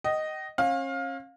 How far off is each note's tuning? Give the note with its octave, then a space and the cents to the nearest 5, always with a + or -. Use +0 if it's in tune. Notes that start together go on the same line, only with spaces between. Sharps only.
D#5 +0 G5 -45
C#4 -40 F5 +20